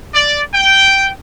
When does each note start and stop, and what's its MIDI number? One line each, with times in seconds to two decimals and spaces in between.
0.13 0.40 74
0.53 1.09 79